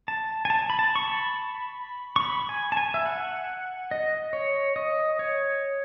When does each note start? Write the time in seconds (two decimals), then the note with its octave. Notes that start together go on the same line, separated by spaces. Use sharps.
0.08 A5
0.45 G#5
0.50 A5
0.70 B5
0.79 A5
0.95 C#6
1.08 B5
2.16 C#6
2.21 B5
2.49 G#5
2.72 A5
2.77 G#5
2.94 E5
3.06 F#5
3.91 D#5
4.33 C#5
4.76 D#5
5.19 C#5